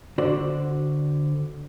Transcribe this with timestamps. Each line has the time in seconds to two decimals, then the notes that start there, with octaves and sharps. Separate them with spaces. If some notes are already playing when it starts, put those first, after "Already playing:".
0.18 D3 F#4 C5 D5